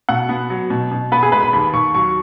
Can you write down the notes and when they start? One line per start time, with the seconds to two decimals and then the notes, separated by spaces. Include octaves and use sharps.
0.09 B2 F#5
0.29 B3
0.50 F#3
0.70 B2
0.91 B2
1.12 B3 B4
1.23 G#4
1.32 G#3 B4
1.43 B5
1.53 D#2 B5
1.74 D#2 C#6
1.95 F#3 C#6